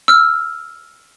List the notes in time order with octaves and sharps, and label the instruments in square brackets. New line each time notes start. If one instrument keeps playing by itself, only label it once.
[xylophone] E6 F6